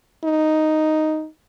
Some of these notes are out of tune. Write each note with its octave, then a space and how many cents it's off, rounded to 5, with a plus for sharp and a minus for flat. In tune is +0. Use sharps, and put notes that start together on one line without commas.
D#4 +0